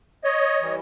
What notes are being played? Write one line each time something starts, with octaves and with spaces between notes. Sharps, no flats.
C#5 D#5
E3 G3